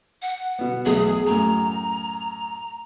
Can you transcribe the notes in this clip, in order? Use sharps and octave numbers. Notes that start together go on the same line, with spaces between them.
F#5
B2 B3
B1 E2 A3 G#4
F#2 A2 A#5